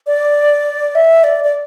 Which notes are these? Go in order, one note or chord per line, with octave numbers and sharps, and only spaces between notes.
D5
E5
D5
D5